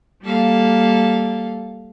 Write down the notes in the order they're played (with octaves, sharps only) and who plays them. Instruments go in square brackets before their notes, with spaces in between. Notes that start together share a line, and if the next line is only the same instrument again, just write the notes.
[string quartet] G3 A#3 A4 F5